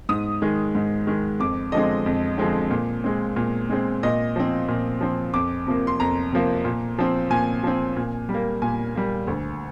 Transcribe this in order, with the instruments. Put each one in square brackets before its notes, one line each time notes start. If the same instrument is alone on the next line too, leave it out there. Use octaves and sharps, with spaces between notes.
[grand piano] G#2 D#6
D#3 G#3
G#2
D#3 G#3
F2 D6
D3 F3 G#3 C4 D#5
F2
D3 F3 G#3 C4
A#2
G#3 C4
A#2
G#3 C4
A#2 D#5
F3 C4
A#2
F3 C4
F2 D6
C3 F3 A#3
C6
F2 A#5
C3 F3 A#3
A#2
F3 C4
A#2 G#5
F3 C4
A#2
G3
A#3
A#2 G#5
G3 A#3
D2